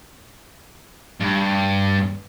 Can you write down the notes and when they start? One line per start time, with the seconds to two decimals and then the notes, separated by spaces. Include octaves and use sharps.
1.20 G2